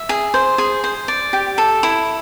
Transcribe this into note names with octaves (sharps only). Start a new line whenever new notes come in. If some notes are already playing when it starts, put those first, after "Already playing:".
Already playing: E5
G#4
C5
G#4
C5
D5
G4
A4
E4